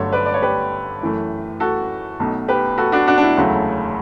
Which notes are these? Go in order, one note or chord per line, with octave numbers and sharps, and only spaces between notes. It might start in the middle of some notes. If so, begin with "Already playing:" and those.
Already playing: G1 G2 D3 F#3 A3 A4 C#5
B4 D5
D5
C#5
G4 B4
F#2 E3 A3
F#4 A4
B1 B2 A3
G4 B4
F#4 A4
D4 F#4
D4 F#4
D4
E4
E1 D2 C#3 F#3 A3